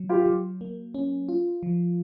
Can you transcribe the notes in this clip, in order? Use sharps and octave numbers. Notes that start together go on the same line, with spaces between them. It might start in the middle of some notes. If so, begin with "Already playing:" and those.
Already playing: F#3
F4 G4
F#3
A#3
C#4
F4
F3